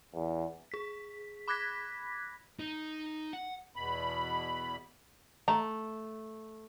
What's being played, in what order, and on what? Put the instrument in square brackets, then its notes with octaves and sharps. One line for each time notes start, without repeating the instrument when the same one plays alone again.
[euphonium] E2
[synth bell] G#4 B6
B5 D6 F#6 G#6 A#6 B6
[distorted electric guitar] D#4
F#5
[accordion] E2 B2 B5
[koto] A3 [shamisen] A#5